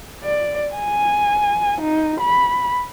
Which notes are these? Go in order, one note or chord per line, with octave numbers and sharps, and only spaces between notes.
D5
G#5
D#4
B5